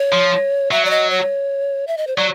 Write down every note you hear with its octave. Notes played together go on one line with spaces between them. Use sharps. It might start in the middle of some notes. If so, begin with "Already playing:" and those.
Already playing: C#5
F3
F#3 E5
D5
D#5
C#5
E5
D#5
C5
F#3 D5